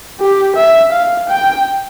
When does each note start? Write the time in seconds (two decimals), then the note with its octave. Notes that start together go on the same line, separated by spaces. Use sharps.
0.20 G4
0.56 E5
0.93 F5
1.29 G5